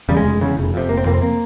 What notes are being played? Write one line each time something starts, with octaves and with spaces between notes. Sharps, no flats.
E2 C#3 G3
G#3
F1
E2 C#3
F1
F2 C3
F1 A#3
C4
F2 C3 A#3
C4
A#3